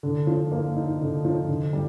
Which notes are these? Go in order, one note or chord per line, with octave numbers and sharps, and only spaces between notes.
D3
F3
A#3
D#4
D3
F3
D3
G3